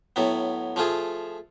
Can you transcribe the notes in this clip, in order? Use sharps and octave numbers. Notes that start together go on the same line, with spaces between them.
A2 F#3 B3
F3 A3 F4 G#4